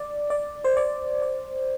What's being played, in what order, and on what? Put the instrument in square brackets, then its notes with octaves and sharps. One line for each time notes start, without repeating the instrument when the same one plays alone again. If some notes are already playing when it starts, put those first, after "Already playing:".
Already playing: [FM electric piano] D5
D5
C5
D5
D5